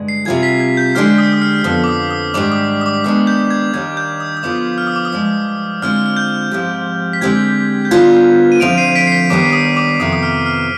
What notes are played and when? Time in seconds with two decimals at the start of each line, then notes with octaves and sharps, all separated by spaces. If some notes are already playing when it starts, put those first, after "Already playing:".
Already playing: G2 D3 G#3
0.08 C7
0.25 C3 G3 C4 F4 G#4 G#6
0.43 B6
0.60 G#6
0.77 G6
0.95 D3 G#3 D4 G4 C5 F6
1.18 D#6
1.33 D#6
1.42 F6
1.64 F2 D3 F3 B3 D#6
1.84 D6
1.88 D#6
2.11 D#6
2.34 G#2 D#3 G3 D4 D6
2.52 D#6
2.81 D#6
2.86 D6
3.04 D#3 G#3 B3 D4 D#6
3.27 G6
3.50 G#6
3.74 D#2 D#3 G3 D4 G#6
3.97 G6
4.20 D#6
4.37 D#6
4.43 D3 F3 B3 F4 C5 D6
4.78 F6
4.87 D#6
4.96 D6
5.05 D#6
5.12 G2 F3 G#3
5.82 D3 G#3 C4 F4 C5 F6
6.06 F6
6.17 G6
6.51 G#2 F3 C4 G4
7.13 B6
7.21 D3 G#3 C4 G4 G#6
7.85 G6
7.91 D3 G3 B3 F4 C5 G#6
8.52 D#7
8.60 D2 D3 F3 C4 D7 F7
8.77 C7 D#7
8.96 B6 D7
9.07 C7
9.12 B6
9.30 D#2 D#3 G3 B3 D4 D6
9.53 D#6
9.77 D6
10.00 F2 C3 D#3 B3 D#6
10.13 D#6
10.23 F6
10.46 F6